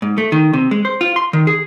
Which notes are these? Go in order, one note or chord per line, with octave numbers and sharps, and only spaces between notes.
G#2
A3
D#3
C3
G#3
C5
F4
C6
D#3
G#4